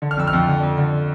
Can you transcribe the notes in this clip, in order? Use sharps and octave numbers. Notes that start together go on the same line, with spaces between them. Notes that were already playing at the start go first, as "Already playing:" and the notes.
D3
F6
F2 E6
F6
F2
D3
F2
D3